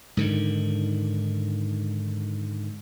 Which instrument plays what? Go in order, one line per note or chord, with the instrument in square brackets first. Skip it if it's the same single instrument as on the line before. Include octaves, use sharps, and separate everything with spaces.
[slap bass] G#2 D3 D#3